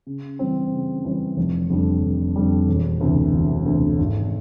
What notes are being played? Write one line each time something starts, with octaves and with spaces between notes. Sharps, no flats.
C#3
E3 G3 C4
C#3
E3 G3 C4
F1
F2 D3 G3
F1
F2 D3 G3
E1
D2 C3 E3
E1
D2 C3 E3
G#1